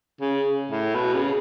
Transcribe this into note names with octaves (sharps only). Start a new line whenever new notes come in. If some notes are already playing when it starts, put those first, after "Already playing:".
C#3
A2
B2
C#3